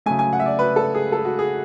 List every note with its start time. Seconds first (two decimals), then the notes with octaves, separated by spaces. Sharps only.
0.06 C#3 F#3 A3 G#5
0.19 G#5
0.33 F#5
0.40 E5
0.46 D5
0.59 B4
0.76 A4
0.94 G#4
1.12 A4
1.25 F#4
1.39 G#4